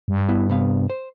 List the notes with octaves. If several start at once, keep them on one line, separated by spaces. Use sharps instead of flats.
G2
B3 E4
C3 B3 F5
C5